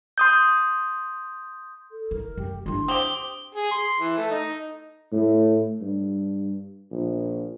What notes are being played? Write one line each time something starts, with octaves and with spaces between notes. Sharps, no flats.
C6 D#6 G6
A4
E4 A#4
F#2 G4
D4 E4 C6
C4 G4 D#6 G7
G#4
C6
E3
A3
D#4
A2
G2
A#1